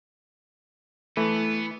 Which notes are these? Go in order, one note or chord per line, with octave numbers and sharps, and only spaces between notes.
E3 A3 B3